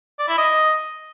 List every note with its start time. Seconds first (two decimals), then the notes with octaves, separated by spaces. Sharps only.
0.19 D5
0.28 E4
0.38 D#5